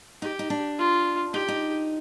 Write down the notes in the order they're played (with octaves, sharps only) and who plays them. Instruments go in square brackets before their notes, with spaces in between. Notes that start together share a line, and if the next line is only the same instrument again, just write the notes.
[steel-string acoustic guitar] D#4 [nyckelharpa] G4
[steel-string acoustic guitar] D#4
D4
[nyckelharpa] F4
[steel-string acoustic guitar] D#4 [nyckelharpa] G4
[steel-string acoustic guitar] D#4